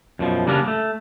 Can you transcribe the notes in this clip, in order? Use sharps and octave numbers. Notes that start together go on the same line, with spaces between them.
F#2 B2 F3
C#3 G3 A#3 B3 D4 A#4
A3